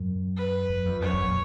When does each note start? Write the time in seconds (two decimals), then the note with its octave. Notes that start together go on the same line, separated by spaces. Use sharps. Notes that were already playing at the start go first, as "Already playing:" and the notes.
Already playing: F#2
0.37 B4
0.69 F#2
0.86 F2
1.02 F#2 C#5
1.13 F#2
1.24 A#2